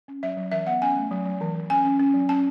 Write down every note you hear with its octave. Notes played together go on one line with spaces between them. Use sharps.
C#4
F#3 E5
F#3
E3 E5
B3 F#5
C#4 G#5
A3
F#3
F#3
E3
E3
C#4 G#5
C#4
C#4
F#3
C#4 A5